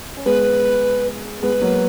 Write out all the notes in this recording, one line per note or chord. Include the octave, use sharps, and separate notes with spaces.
C#4
G#3 B3 B4
G#3 B3 B4
F#3 A#3